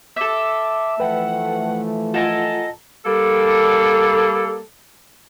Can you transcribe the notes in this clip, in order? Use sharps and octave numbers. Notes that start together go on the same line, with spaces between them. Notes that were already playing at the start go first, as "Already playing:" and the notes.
A4 E5 D6
E3 F3 A3 B4 F#5 G5
F4 A4 A#4 D#5 F#5 G#5
G3 A#3 A4